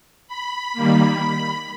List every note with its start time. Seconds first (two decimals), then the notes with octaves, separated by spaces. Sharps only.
0.27 B5
0.73 D#3 G3 A#3